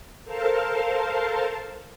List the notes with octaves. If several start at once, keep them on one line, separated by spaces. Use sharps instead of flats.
A4 A#4 C5 F5 A5